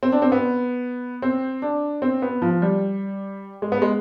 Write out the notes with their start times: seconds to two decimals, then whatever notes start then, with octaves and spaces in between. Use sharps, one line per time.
0.03 C4
0.12 D4
0.22 C4
0.32 B3
1.22 C4
1.62 D4
2.02 C4
2.22 B3
2.42 F3
2.62 G3
3.62 G#3
3.72 B3
3.82 G#3